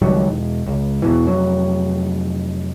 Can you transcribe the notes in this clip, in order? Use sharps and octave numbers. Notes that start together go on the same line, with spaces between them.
C#2 D#3 F#3 G3
E1
C#2
E2 B2 E3
F1 F#3